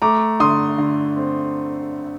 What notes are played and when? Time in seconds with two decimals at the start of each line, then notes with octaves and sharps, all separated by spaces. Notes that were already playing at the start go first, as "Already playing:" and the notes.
0.02 A3 A#5 D6
0.40 D3 C6 D#6
0.78 D3
1.17 C4